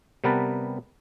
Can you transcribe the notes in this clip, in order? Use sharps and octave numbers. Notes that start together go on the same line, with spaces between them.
C3 G3 B3 A#4 B4 A5